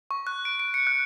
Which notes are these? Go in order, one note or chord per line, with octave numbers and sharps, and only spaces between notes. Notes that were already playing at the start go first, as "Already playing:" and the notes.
C#6
F#6
D7
D7
C#7
F#6